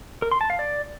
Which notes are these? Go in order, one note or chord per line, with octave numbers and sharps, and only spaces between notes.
A#4
C6
A5
F5
D5